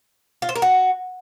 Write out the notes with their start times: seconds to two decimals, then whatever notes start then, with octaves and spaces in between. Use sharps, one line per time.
0.42 F4
0.49 C5
0.55 A#4
0.62 F#4